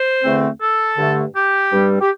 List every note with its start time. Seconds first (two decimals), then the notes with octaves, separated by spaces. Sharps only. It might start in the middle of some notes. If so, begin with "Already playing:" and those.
Already playing: C5
0.23 E2 D3 A3 C4
0.60 A4
0.97 G2 D3 A3
1.35 G4
1.72 G2 G3 C4
2.01 G4